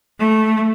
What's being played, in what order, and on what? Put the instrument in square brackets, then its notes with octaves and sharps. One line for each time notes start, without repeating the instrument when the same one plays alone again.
[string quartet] A3